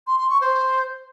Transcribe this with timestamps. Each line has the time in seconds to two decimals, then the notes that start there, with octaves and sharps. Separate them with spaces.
0.07 C6
0.18 C6
0.30 C#6
0.41 C5